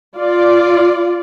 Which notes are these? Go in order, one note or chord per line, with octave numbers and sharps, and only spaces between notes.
F4 D5